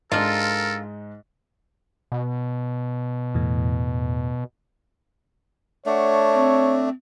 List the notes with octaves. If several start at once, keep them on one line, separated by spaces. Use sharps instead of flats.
G#2 G#3 D4 F4 A4 A#4
B2
E2 A2
A3 D4 C#5 F#5
C4